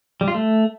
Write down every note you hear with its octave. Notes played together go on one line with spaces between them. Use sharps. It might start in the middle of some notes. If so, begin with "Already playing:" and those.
G3
F4
A3